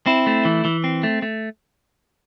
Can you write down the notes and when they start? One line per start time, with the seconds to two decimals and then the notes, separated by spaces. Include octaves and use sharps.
0.06 C4 E4
0.27 A3
0.45 E3
0.65 E3
0.84 C4
1.03 A3
1.22 A3